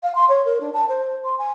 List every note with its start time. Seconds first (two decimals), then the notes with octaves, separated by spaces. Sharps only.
0.03 F5
0.15 C6
0.29 C#5
0.45 A#4
0.60 D4
0.73 A5
0.89 C5
1.24 C6
1.39 G#5